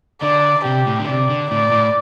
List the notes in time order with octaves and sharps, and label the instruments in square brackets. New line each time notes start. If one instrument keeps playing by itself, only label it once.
[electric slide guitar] D3 [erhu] D5
[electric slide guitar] C3 [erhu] G4
[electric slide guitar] A2
D3
[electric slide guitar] C3 [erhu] D5
[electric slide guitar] D3
[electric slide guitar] A2 [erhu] D5
[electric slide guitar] A2